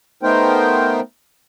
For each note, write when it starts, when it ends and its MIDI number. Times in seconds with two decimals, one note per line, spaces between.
0.23 1.00 57
0.23 1.00 59
0.23 1.00 63
0.23 1.00 70
0.23 1.00 72
0.23 1.00 79